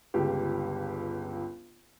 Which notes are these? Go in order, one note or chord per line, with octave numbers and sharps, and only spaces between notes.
G1 C#2 G4